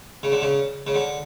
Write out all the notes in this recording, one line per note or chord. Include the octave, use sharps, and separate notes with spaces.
C#3
D3
C#3
C#3
D3